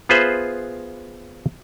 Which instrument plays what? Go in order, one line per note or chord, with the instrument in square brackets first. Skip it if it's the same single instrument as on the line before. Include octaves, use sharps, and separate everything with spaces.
[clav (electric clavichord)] B3 F4 G#4 B4 C5 E5